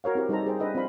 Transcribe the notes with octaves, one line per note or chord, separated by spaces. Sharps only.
F#4 A#4 C#5 F5
C4 E4 G4 A#4
G3 D#4 G4 A4 C5 A#5
G#4 C5 G5
D4 A4 B4 D#5 E5 G5
C4 F4 D5 F5 B5